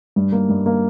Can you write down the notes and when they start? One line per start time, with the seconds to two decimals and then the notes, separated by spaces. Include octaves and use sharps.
0.16 G2
0.32 A#3
0.49 G2
0.66 A#3